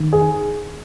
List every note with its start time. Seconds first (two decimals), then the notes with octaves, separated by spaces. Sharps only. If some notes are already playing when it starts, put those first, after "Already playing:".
Already playing: D#3
0.13 G#4